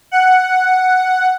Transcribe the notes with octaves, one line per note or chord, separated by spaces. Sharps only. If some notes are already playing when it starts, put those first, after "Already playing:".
F#5